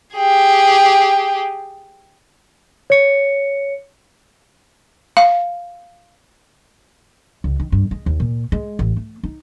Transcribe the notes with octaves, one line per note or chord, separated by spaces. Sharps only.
G4 G#4
C#5 C#7
F5
C#2
D#3
G2
G#3
D#2
A#2
G#3
A1
A3
D#4